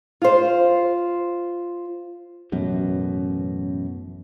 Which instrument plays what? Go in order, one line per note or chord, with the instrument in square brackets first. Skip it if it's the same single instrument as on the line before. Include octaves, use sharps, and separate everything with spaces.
[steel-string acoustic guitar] F4 C5
[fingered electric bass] A1 F#2 B2